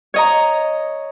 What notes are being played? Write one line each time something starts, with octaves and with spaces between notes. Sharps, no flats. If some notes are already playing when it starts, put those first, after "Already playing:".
C#5 D#5 A#5